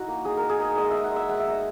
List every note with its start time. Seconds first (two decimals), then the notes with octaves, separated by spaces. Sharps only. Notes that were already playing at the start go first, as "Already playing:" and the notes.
Already playing: D#4 E4 F#4
0.08 A#3
0.25 D#4 G#4
0.37 A#4
0.43 D#4
0.50 G#4
0.60 D#4
0.77 G#3 D#5
0.90 D#4 E5
1.04 F#5
1.12 G#3 E5
1.29 G#3 F#5
1.40 E5
1.46 D#4 D#5